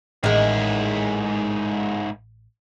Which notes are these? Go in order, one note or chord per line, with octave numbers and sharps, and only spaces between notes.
A1 G#2 D#3 G#3 E4